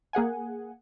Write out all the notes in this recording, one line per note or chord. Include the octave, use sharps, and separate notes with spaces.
A#3 G#4 F#5 G#5